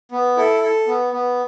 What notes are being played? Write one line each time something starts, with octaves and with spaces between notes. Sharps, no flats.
B3
E4 A4
A4
B3
B3